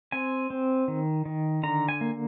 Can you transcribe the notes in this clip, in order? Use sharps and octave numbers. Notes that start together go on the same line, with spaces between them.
C4 G#5
C4
D#3
D#3
D3 A#5
G#5
A#3